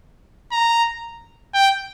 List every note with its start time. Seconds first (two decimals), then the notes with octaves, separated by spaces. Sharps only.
0.52 A#5
1.54 G5